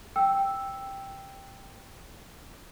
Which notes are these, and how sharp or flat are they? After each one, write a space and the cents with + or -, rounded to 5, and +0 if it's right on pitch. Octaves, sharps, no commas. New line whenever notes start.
G5 +0 E6 +0